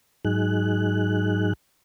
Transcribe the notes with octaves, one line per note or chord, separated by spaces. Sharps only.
G#2 F#3 D#4 G#4 F#6